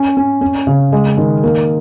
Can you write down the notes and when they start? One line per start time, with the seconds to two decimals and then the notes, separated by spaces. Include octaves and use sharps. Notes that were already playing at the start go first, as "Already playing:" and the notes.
Already playing: C#4
0.17 C#4
0.41 C#4
0.67 C#3
0.92 G#3
1.17 D#3
1.43 A#3